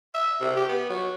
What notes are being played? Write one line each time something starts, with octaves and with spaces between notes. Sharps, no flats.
E5
C3
G4
B3
F#3